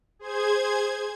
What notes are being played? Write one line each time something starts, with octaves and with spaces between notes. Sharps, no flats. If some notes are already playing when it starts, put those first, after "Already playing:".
G#4 C5 G#6